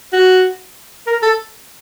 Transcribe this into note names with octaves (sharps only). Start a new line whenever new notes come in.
F#4
A#4
A4